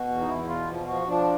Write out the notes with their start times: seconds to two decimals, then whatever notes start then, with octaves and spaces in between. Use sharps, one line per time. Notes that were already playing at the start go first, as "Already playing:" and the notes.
Already playing: B2 F#4
0.09 E2
0.21 D#4
0.28 E2 E4
0.48 B2 F4
0.68 F3
0.88 F3 F#4
1.07 F3 D4